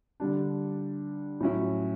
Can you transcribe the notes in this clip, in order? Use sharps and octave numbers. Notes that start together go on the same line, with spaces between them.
D3 G3 D4
A2 F#3 C#4 E4